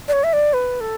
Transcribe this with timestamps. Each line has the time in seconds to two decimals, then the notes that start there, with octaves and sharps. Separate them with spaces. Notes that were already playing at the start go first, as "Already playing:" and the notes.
0.08 D5
0.13 C#5
0.24 E5
0.33 D5
0.53 B4
0.81 A4